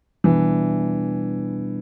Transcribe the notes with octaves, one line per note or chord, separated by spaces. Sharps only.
B2 E3 G3 B3 D4